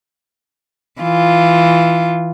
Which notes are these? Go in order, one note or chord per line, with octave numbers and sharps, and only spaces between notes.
E3 F4